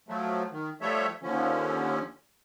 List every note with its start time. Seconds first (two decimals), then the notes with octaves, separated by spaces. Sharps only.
0.08 F3 F#3 A3
0.52 D#3
0.81 F3 G3 A3 A4 C#5 E5
1.23 D#2 D3 F3 C#4